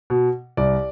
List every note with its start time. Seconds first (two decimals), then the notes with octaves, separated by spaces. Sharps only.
0.10 B2
0.57 C2 D5